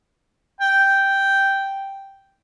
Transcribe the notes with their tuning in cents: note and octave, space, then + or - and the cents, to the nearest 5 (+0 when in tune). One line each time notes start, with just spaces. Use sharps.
G5 -5